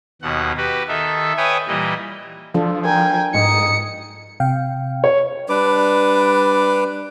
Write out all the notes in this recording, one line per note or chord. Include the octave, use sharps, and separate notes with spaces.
D#2 B2 F#5
F#4 G4 B4
D#3 D#4 A4 E5
B4 C#5 E5 G5 G#5 D#6
A#2 E3 G3 D#5
F3 D4 F4 A4
A#4 G5 G#5
G#2 D#4 D#6 C#7
C3 F5 G5
C#5
G3 D4 B4 D6